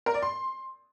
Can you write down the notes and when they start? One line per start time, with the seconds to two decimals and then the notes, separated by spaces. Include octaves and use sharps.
0.06 A#4
0.14 D5
0.22 C6